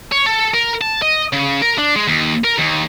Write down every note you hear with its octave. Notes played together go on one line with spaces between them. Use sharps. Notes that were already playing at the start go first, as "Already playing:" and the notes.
C#5
A4
A#4
A5
D#5
C#3
A#4
D4
G#3
D#2
A#4
D#2